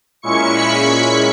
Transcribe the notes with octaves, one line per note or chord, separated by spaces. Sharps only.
A#2 G#3 C#4 E4 C#6 C#7
B5 B6